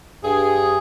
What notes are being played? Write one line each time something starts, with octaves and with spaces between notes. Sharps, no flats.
G2 G#4